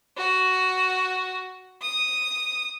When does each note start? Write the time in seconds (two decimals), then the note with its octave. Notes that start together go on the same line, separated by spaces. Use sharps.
0.17 F#4
1.82 D#6